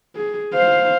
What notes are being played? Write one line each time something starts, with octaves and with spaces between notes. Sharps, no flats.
G#4
C5 F5